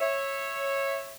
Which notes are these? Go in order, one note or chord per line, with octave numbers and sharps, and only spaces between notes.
C#5 E5